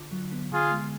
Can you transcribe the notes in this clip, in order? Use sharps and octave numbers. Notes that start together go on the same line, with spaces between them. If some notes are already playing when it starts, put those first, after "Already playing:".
Already playing: D3 F4
F#3
B3
D3 F4 G#4
G#3